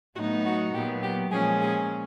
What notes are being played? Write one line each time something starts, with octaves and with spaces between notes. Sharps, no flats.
A2 F#3 B3 D#4 F#4
F#4
A#2 F#3 B3 G4
G4
A#2 F3 G#3 C#4 G#4
G#4